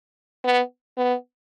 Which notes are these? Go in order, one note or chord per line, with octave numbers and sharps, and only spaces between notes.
B3
B3